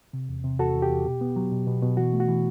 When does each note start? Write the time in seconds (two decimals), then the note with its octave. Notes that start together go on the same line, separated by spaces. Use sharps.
0.13 C3
0.29 E2
0.44 C3
0.59 E2 F#4 A4
0.75 E2
0.82 G4
0.90 E2
1.05 B2
1.21 B3
1.36 F#3
1.51 B2
1.67 B2
1.83 B2
1.97 E3 F#4
2.13 A3
2.20 F#4
2.28 E3